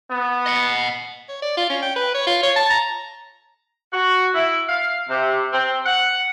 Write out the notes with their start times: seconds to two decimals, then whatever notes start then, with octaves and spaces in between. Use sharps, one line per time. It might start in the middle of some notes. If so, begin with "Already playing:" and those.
0.10 B3
0.46 D#5 F#5
1.29 C#5
1.42 D5
1.57 F4
1.70 C#4
1.82 G5
1.96 B4
2.15 C#5
2.27 F4
2.43 C#5
2.56 A5
2.70 A#5
3.93 F#4
4.35 E4
4.69 F5
5.09 C3
5.53 C4
5.86 F#5